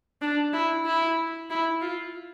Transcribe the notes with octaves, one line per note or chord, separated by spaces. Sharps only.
D4
E4
E4
E4
F4